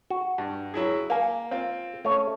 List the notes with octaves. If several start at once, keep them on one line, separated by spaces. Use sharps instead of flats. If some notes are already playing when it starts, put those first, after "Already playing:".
F#4
G2
F#3 E4 G#4
A#3 F5 G#5
C4 F4
A3 C#4 C#5